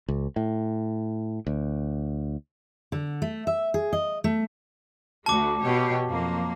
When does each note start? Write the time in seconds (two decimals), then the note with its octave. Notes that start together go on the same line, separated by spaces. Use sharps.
0.08 C#2
0.36 A2
1.47 D2
2.92 D3
3.22 A3
3.47 E5
3.74 G#4
3.93 D#5
4.24 A3
5.26 D2 A3 F#4 A5 D6
5.64 B2 G4 C#5
6.06 F2 F#3 A#3